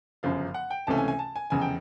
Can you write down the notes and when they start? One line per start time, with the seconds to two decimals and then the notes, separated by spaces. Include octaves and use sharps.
0.23 G1 F#2 C#3 F3 F5
0.54 F#5
0.71 G5
0.87 C#2 C3 E3 A3 C#4 A5
0.98 G#5
1.08 G#5
1.19 A5
1.36 G#5
1.50 F1 E2 C#3 G#5
1.61 G5